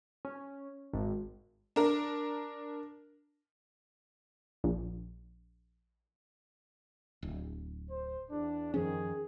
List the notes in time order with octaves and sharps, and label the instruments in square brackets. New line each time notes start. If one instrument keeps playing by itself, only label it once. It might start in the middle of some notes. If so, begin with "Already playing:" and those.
[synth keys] C#4
G#1
[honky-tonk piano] D4 A#4
[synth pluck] A#1
[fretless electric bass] D1
[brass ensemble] C5
E2 D4
[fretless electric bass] F#2 F3 C#4 [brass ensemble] D#3 G#4